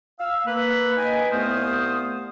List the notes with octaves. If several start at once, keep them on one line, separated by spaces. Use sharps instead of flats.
F5 E6
A#3 B4
D#4 B4 D#5 G5 G#5
C2 A3 B3 C5 F5 D#6